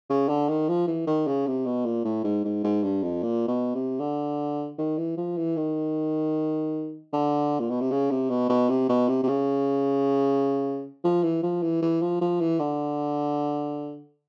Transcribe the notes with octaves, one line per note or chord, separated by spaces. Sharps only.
C#3
D3
D#3
F3
E3
D#3
C#3
C3
B2
A#2
A2
G#2
G#2
G#2
G2
F2
A#2
B2
C3
D3
D#3
E3
F3
E3
D#3
D3
A#2
B2
C3
C#3
C3
B2
B2
C3
B2
C3
C3
C#3
F3
E3
F3
E3
E3
F3
F3
E3
D3